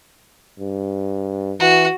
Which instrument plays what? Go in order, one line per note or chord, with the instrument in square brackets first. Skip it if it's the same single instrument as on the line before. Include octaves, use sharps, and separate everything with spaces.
[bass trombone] G2
[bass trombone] E3 [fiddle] F#4